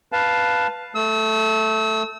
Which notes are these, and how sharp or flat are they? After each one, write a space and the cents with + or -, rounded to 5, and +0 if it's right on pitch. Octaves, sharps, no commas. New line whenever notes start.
B4 +0 F5 +5 A5 +0
A3 +0 E6 -35